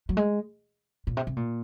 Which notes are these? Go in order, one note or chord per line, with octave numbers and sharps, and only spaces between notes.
F#3
G#3
A#2
C3
C3
A#2